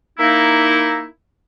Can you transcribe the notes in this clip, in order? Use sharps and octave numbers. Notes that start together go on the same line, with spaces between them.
A#3 D#4 E4